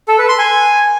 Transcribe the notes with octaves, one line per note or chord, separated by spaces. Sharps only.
A4
B4
C6
G#5